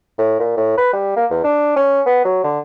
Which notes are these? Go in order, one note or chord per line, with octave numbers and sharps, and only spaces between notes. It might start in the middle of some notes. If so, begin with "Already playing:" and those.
A2
A#2
A2
B4
G3
A#3
E2
D4
C#4
B3
F#3
D3